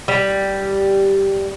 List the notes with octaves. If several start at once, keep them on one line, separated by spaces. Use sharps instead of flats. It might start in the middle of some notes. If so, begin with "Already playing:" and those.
G3